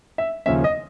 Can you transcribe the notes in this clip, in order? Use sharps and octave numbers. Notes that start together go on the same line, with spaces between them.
E5
D#2 C#3 F3 A#3 C#4 E5
D#5